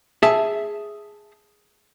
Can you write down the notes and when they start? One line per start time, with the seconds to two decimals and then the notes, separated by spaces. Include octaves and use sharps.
0.23 G#4 E5 A5